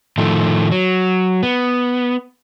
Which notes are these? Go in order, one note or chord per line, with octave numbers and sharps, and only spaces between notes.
A2 D#3 F3 A3
F#3
B3